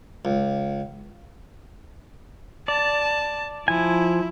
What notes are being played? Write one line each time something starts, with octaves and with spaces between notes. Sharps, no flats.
C#2
D5 A5
F3 E4 G#5